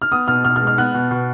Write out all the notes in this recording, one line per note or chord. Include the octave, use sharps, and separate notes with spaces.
F6
B3 D#6
B2 F6
B2 F6
F6
G#3
F6
B3 F#6
B2
B2